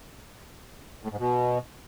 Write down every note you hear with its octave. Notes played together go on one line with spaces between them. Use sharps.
A2
G#2
B2